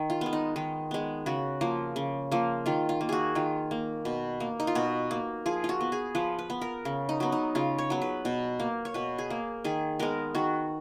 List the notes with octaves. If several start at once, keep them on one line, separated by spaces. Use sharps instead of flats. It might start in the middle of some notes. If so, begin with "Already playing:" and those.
Already playing: D#3
F4
G#3 B3
D#4
D#3 D#4
G#3 B3
C#3 F#4
F3 A#3
C#3
F3 A#3
D#3 F4
F4
A#3
F#4 G#4
D#3 F4
A#3
B2
A#3
D#4
F4
B2 F#4
A#3
F3 G#4
F4
F#4
B3
G#4
F3 B4
B4
B3
A#4
C#3
D#4
F#3 B3
D#4
C#3 F4
C#5
F#3 B3
B4
B2
A#3
C#5
B2 B4
G#4
A#3
D#3 G#4
G#3 B3 A#4
D#3 F#4